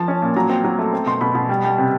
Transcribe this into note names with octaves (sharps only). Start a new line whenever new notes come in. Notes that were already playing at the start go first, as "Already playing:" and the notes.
Already playing: F3 A5
C#4
A#2
F#3 A#5
C4
F#3
A3
C4
B2 C6
B2 B5
B2
G3
G3
C3